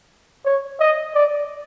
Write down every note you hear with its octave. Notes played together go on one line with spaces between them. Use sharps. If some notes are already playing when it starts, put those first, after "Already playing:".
C#5
D#5
D5